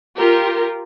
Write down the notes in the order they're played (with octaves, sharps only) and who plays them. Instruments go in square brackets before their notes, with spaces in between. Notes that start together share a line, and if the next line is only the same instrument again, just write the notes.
[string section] F4 G4 A#4